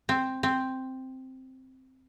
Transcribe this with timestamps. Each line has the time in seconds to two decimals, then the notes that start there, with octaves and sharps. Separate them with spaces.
0.09 C4
0.43 C4